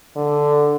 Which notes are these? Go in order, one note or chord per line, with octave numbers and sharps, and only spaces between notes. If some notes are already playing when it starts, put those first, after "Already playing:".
D3